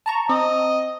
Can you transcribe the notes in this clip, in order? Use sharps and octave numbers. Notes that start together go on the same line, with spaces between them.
A5 A#5 C#6
C4 D#5